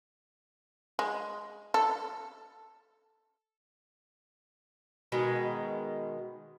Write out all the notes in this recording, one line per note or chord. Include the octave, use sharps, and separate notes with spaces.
G#3
A4
B2 D#3 G#3